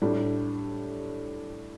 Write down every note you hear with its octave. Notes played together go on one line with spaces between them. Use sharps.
A2 G3 D4